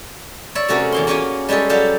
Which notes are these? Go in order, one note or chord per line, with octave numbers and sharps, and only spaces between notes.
C#5 D5 E5
C3 A3 C#4 F#4 G#4 A#4
E2 A#3 C6
A#3 C#4 F4 F#4 C#5 G#5
G3 G#3 C#4 G#4 A4
F#3 G3 G4 F5 F#5 A5